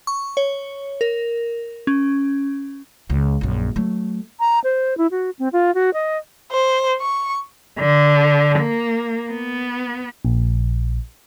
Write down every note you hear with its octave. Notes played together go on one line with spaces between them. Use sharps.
C#6
C#5
A#4
C#4
C#2
A#1 F#2
F#3 A3
A#5
C5
E4
F#4
C4
F4
F#4
D#5
C5
C#6
D3
A#3
B3
A#1